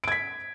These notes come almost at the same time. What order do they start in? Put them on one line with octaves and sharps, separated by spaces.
D7 G#6 B6